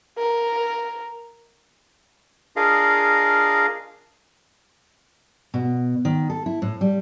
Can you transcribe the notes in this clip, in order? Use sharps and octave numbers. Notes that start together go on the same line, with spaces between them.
A#4
D4 F4 G#4 A#4 D#5 F5
B2
D#3
A4
E4
A2
G3